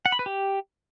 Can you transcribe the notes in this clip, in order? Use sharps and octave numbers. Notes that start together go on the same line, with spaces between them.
F#5
B5
B4
G4